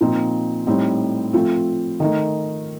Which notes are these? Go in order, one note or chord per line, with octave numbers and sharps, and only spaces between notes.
A#2 F3 C4 D#4
A2 G3 C4 D#4
F3 A3 C4 F4
D#3 A3 D#4